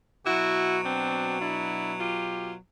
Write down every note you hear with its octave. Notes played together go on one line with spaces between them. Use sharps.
B2 F#3 E4 F#4
C4 D4
D4 E4
F4 G4